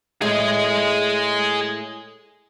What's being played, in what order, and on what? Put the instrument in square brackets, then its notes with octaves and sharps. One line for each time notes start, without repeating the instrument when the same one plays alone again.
[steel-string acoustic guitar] A2 G#3 [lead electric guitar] G#4 D#5